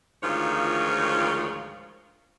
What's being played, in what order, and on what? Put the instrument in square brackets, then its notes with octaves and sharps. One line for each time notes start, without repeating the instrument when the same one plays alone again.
[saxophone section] D2 G#2 D#3 F3 F4 C#5